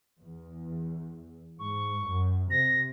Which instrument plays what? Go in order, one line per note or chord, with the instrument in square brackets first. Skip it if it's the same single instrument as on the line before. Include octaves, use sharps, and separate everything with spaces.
[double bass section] E2
[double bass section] G#2 [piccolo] C#6
[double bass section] F#2
[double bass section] C3 [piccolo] A#6